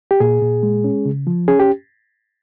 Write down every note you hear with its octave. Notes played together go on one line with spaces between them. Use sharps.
G4
A#2 G#4
A#2
G#3
C#4
C#3
F3
C#4 G#4
G4